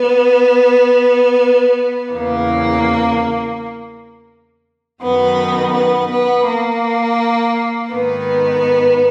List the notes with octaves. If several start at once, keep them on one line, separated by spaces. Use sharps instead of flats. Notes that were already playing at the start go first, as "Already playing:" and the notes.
Already playing: B3
E2 C#3 E3 A#3
F#2 D#3 B3
B3
B3
A#3
G#2 D#3 B3